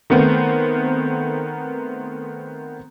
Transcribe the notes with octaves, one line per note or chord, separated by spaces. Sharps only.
D#3 A3 B3 C4 A#4 C5